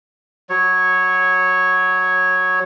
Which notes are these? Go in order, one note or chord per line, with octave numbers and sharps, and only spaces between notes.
F#3 C#5